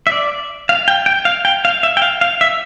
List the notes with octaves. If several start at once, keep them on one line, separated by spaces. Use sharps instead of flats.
E5
D5
F5
G5
G5
F5
G5
F5
E5
G5
F5
F5
E5